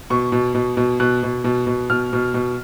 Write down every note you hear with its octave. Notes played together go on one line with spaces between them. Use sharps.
B2 C#6
B2
B2
B2
B2 F#6
B2
B2
B2
B2 F6
B2
B2